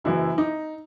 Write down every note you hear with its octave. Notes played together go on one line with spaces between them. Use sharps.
F#1 F#2 E3 E4
D#4